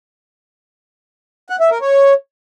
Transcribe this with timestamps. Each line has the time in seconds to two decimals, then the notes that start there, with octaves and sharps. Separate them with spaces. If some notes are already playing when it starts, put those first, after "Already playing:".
1.50 F#5
1.60 E5
1.71 A#4
1.81 C#5